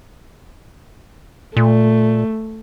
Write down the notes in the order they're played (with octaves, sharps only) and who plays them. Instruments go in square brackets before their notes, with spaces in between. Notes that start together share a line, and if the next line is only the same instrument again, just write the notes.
[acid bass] A#2 [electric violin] A3